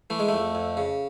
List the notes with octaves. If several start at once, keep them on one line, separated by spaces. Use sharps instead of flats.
E3 A3
G#3
F2 A3
F2
C#3